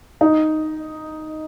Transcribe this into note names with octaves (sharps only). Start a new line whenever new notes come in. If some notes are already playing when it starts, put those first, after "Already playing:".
D#4